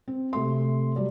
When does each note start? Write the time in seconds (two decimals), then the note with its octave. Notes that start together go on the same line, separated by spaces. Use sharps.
0.08 C4
0.33 C3 A3 C6
0.96 F#3 G3 D5